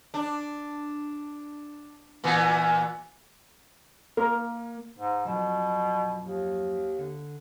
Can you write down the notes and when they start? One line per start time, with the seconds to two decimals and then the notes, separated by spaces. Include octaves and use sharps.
0.14 D4
2.24 A#2 E3 B3
4.17 A#3 A#4
4.98 G#2
5.25 F#2 B2 F3 F#3
6.25 D#2
6.98 D3